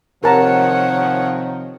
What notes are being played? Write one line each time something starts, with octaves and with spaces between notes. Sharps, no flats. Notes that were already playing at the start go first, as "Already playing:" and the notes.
C3 D#3 F3 A#4 C#5 F#5 A5 A#5